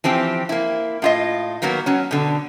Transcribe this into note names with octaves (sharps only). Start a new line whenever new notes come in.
E3 F3 C4 G4
A#3 E4
A2 F4 D#5
D#3 F#3 A#3 B3 F#4
F#3 C#4
B2 D3